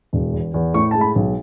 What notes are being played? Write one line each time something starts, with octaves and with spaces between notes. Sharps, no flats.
E1
E2
E2
A2 C#6
G#3 A5
B5
B1